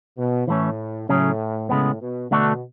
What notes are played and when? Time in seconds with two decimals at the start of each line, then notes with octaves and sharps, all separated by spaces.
0.18 B2
0.47 A2 E3 A3 C#4
1.09 A2 C#3 F#3 C#4 G#4
1.69 A2 C#3 G#3 B3
2.01 B2
2.30 B2 D3 A3 D4 F#4